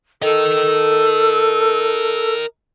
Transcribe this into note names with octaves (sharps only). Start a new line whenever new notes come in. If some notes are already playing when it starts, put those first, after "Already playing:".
A4 A#4 D#5